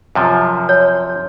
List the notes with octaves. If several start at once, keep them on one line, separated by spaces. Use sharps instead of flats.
F#2 C3 F3
C#5